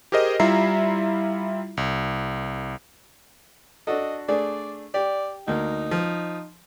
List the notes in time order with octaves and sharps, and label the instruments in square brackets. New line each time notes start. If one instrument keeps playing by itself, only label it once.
[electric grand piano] G4 G#4 A#4 C5 D#5
G3 E4 F4 E5 A#5 C7
C2
[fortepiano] D4 F#4 A4 [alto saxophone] D#5
[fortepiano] A3 D4 G#4 [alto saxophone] D5
[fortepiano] G4 [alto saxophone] D5
[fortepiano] D2 A#3 [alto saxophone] D#4
[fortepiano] F3